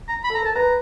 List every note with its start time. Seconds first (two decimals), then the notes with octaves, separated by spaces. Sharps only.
0.08 A#5
0.24 B5
0.30 A4 A#5
0.43 A#4 A5
0.55 B4 A#5